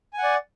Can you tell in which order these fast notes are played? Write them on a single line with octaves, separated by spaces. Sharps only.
G#5 F#5 D5